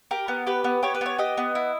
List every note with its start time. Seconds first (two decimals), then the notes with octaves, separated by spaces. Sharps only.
0.11 G4 A#4
0.28 B3
0.47 G4 B4
0.64 B3
0.83 G4 C#5
0.94 B4
1.01 B3 C#5
1.18 G4 D#5
1.37 B3
1.55 E4